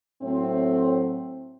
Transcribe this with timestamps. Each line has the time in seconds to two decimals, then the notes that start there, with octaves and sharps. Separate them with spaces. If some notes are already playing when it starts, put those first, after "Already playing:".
0.22 A2 F#3 A3 C4